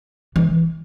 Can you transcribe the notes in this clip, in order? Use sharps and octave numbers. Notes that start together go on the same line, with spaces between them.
E3